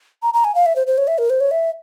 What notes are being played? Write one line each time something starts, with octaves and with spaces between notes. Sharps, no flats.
A#5
A#5
G#5
F5
E5
C5
C5
C#5
E5
A#4
C5
C#5
E5